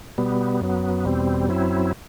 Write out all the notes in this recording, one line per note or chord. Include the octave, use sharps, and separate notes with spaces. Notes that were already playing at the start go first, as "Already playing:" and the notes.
B2 G3 B3
F#2 F#3 B3
E2 B2 G3 C4
F#2 F#3 C4 E4